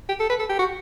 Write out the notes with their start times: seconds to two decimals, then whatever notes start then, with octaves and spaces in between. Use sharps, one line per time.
0.09 G4
0.20 A4
0.29 B4
0.39 A4
0.49 G4
0.59 F#4